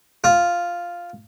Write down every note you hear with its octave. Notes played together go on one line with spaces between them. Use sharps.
F4